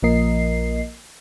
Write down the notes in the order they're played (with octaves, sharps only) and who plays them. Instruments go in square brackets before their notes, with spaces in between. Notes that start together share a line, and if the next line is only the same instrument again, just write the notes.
[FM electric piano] A#1 F3 A#3 A#4 D#5 C7